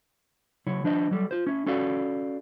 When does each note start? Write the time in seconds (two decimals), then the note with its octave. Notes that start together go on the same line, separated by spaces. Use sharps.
0.67 C#3 F#3 E4 C#5
0.84 F3 D4 C5 D#5
1.11 F#3 G3 A4
1.31 F4 C5
1.47 C#4 E4
1.66 C#4 F#4 A4 D5 F5